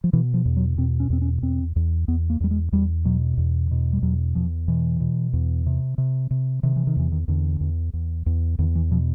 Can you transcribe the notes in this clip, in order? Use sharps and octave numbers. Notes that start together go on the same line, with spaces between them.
F3
B2 E3
F3
E2
F#3
B2 C4
C#4
E2 C4
C#4
E2 C4
E2
E2 B3
A#3
E2 G3
G#3
E2 G3
B2 F#3
E2
B2
G3
E2 F#3
E2 F3
B2 E3
B2
E2
C3
C3
C3
C3 D#3
E3
D#3
E2 E3
D#3
E2 D3
E2
E2
E2
E2 D#3
E3
B2 F3